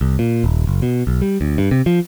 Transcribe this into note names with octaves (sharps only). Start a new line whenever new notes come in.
C2
A#2
D#1
F#1
B2
B1
G3
D2
G2
C3
F3